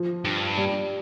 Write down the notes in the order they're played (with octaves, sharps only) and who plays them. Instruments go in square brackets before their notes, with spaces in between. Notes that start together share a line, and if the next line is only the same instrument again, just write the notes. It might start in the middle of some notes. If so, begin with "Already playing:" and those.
Already playing: [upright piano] F3
[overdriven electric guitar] G2
[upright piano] G3